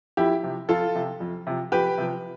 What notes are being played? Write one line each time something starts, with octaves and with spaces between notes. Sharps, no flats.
F2 E4 G4
C3 F3
F2 F4 A4
C3 F3
F2
C3 F3
F2 G4 B4
C3 F3